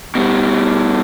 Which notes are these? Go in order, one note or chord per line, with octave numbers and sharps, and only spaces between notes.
B2 G3